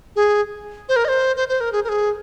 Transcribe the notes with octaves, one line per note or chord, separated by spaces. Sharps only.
G#4
C5
A#4
D#5
C5
C5
C5
A#4
G#4
A#4
G#4